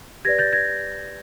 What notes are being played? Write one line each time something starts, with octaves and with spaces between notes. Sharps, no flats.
G4 B4 D5 G#6 A#6
G6 A6
G#6 A#6